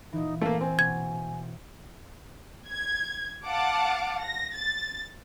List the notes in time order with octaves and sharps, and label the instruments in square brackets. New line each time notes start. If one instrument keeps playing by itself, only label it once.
[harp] A#2 E3 [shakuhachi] D#4
[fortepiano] A3 A#3 [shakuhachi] F5
[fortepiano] C4 [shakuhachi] G#5
[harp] B2 [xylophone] G#6
[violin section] G#6
F5 F#5 A5 D6
A#6
A6